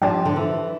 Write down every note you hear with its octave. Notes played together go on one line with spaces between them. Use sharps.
F3 G3 D4 G4
D3
E3